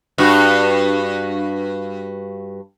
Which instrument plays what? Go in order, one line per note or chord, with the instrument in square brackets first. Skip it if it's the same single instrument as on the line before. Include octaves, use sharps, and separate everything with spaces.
[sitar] G2 F#4